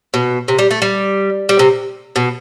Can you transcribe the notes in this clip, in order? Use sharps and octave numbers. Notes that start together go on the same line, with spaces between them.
B2
C3
G3
A3
G3
G3
C3
B2